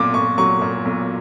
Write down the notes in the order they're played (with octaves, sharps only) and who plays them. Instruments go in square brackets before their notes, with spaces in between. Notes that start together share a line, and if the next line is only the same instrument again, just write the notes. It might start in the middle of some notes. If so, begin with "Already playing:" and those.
Already playing: [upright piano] B1 A#2 D6
A#2 C#6
F#3 C#6
A#2
B1